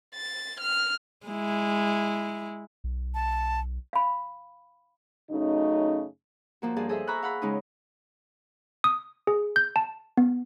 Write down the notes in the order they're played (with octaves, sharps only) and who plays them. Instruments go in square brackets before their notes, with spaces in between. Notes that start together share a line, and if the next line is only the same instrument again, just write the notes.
[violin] A6
F6
[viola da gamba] G#3 E4
[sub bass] B1
[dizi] A5
[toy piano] F5 B5
[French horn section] F#2 C#3 A3 D#4
[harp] F3 A#3 F#4
G2 F3 G#4 A5
G#4 A4 C5 D#5 E5
E5 A#5 B5 C#6 E6 F#6
F5 F#5 B5
C#3 G#3 C#4 D#4 F4
[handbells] D#6
G#4
G6
A5
B3